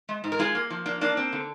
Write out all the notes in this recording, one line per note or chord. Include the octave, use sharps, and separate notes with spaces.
G#3
G#2
A#4
G#3 F4 G#4
A#3
F3
A#3 D4
A#3 D4
C4
D3